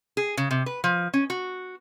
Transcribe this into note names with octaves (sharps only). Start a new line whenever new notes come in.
G#4
C#3
C3
B4
F3
C#4
F#4